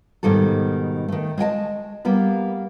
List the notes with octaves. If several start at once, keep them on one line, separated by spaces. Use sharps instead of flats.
G#2 B2 D#3 G3 A4
D#3 A3
G#3 D#5 G5 A5
G3 A#3 B3 B4